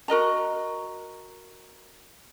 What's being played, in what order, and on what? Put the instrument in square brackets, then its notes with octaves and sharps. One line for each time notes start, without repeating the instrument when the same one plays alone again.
[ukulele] F#4 A#4 D#5 A#5